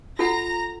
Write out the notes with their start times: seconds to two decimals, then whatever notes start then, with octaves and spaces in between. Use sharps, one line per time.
0.19 F4 A4 F#5 A#5 A#6